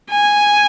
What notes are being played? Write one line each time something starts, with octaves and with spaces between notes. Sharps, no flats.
G#5